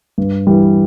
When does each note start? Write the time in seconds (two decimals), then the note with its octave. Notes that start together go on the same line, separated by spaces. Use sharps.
0.18 G2
0.47 E3 G3